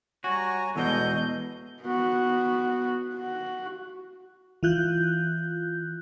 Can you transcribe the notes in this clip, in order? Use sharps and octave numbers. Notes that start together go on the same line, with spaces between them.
G3 F#4 C#5 G#5 A#5
E2 B2 G#3 A4 D#5 G6
B3 F#4
F#4
E3 F4 F#6 G6